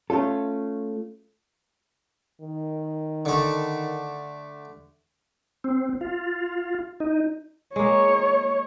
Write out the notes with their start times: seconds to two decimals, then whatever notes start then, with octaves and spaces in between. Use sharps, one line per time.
0.10 A3 C#4 F4 A4
2.41 D#3
3.25 D3 A3
5.64 C4
6.01 F4
7.00 D#4
7.76 G#3 A#3 C#5